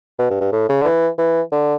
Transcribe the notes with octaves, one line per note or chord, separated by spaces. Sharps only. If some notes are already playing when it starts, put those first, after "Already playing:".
B2
G2
G2
A2
C#3
D3
E3
E3
D3